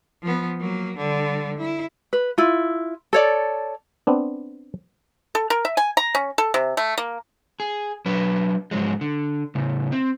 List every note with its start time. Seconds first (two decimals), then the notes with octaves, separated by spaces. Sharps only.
0.23 F3 B3
0.60 F#3 A#3
0.97 D3 G3
1.58 E4
2.13 B4
2.38 E4 F4
3.13 A4 C#5 D5
4.07 B3 C4 D4
5.35 A4
5.50 A#4
5.65 E5
5.77 G#5
5.97 A#5
6.15 C#4
6.38 A4
6.54 C3
6.77 A3
6.98 A#3
7.60 G#4
8.06 F#3 D4 B4
8.71 G#2 F3 F#3 G#3
9.01 D3
9.55 A2 C#3
9.92 C4